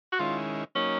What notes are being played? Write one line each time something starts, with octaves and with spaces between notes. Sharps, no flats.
F#4
D#3 G#3 C#4 E4 F4
F#3 A#3 C#4 D#4